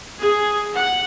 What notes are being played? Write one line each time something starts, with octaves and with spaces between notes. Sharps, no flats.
G#4
F#5